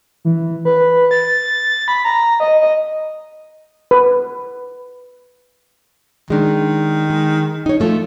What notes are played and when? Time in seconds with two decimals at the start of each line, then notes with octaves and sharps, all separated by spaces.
0.25 E3
0.65 B4
1.11 A6
1.88 B5
2.05 A#5
2.40 D#5
2.61 D#5
3.91 B4
6.30 D#3 G#3 D4
7.10 G#3
7.66 D#4 C#5
7.80 F3 A3 F4